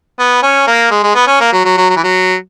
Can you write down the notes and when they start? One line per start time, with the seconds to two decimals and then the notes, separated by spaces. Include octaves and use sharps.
0.19 B3
0.43 C#4
0.67 A#3
0.91 G#3
1.04 G#3
1.16 B3
1.28 C#4
1.41 A#3
1.53 F#3
1.65 F#3
1.78 F#3
1.90 F#3
1.96 E3
2.04 F#3